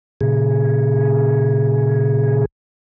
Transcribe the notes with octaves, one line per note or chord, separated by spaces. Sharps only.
A#2 C#3 G#4